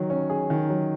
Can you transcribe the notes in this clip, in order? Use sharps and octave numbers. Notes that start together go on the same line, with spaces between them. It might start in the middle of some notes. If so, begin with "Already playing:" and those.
Already playing: D#3 F#3
C#4
G#4
D#3
F#3